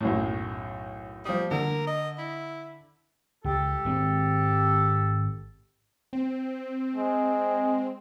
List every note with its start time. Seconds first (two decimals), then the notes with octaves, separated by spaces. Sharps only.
0.01 B1 F#2 A2
1.25 F3 G3 D#6
1.51 D3 A#4
1.88 D#5
2.18 E4
3.44 C#2 G4 A4
3.85 G#1 G#3 C4
6.13 C4
6.96 G#3